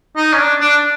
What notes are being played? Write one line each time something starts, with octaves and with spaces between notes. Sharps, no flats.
D#4
C#4
D4
D4